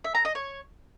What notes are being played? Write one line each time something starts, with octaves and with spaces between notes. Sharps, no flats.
E5
A#5
D#5
C#5